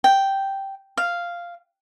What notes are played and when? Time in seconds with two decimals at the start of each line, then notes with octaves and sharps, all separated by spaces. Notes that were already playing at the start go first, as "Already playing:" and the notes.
0.04 G5
0.97 F5